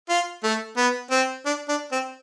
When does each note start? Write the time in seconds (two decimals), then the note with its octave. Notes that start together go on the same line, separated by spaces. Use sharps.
0.09 F4
0.44 A3
0.77 B3
1.11 C4
1.45 D4
1.69 D4
1.92 C4